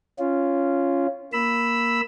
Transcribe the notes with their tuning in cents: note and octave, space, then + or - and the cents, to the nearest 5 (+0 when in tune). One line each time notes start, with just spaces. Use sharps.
C#4 +0 F4 -10
A#3 +5 B5 +0 E6 +0